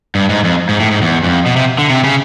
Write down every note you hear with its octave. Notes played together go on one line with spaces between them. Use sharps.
G2
G#2
F2
G#2
A2
G#2
E2
F2
B2
C3
D3
C3
C#3